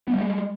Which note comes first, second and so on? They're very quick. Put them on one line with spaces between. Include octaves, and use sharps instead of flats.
B3 G3 A#3 G#3